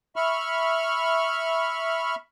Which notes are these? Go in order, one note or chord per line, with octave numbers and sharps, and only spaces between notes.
E5 B5 C#6 F6